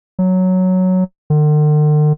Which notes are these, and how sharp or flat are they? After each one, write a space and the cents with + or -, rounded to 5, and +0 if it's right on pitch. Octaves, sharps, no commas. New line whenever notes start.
F#3 +0
D3 +45